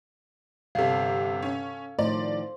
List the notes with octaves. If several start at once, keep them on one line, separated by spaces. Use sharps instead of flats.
G1 C3 A4 F5
C#4
A2 D#3 F3 C5 D5